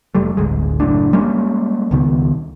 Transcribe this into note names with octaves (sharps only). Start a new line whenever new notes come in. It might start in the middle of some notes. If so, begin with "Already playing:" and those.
F1 G3 A3
D1 G1 G#3
F#1 A2 D4
G3 G#3 A#3 C#4
C#2 B2 D#3